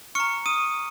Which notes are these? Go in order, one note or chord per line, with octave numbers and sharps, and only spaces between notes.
A#5 C#6 F6 C#7
D#6 D#7